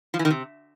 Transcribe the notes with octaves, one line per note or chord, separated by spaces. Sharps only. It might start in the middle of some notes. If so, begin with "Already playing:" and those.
F3
E3
D#3
C3